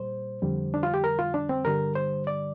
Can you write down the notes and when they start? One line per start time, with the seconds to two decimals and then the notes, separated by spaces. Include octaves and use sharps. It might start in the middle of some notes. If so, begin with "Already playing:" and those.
Already playing: A#2 G3 C5
0.42 F2 D3 G3
0.74 D4
0.83 F4
0.94 G4
1.04 A#4
1.19 F4
1.34 D4
1.49 C4
1.65 G2 D3 G3 A#4
1.95 C5
2.27 D5